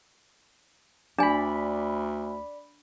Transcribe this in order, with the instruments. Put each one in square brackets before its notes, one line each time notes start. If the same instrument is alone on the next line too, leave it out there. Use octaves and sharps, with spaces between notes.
[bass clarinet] D2 [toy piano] D4 G#5 [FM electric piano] D5 B5